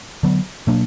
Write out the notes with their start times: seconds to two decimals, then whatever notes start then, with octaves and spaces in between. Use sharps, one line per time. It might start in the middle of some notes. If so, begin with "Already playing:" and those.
0.23 D3 F#3 B3
0.67 B2 F#3 A#3 D4